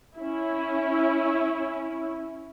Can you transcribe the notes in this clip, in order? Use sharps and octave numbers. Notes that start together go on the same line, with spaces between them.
C#4 E4